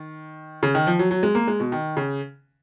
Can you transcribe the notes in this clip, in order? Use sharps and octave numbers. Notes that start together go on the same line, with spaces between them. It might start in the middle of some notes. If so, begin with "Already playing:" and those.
Already playing: D#3
C#3
D#3
F3
F#3
F#3
G#3
A#3
G#3
B2
D#3
C#3